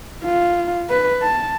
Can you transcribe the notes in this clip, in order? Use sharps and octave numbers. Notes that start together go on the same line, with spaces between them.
F4
B4
A5